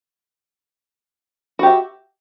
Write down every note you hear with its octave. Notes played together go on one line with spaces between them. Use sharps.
F#4 G4 E5